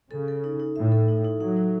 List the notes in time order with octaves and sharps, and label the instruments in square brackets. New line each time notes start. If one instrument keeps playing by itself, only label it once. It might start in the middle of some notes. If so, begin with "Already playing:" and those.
[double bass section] C#3 [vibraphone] A4
[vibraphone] A4
D#4
D#4
[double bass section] A2 [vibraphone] E5
[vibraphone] A4
D#4
D#4
[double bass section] F#3 [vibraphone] D#4
[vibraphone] D#4